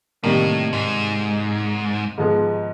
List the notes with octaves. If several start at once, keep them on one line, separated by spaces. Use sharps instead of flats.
A2 C3 D#3 G3 A#3
G#2
G#2 F3 G#3 B3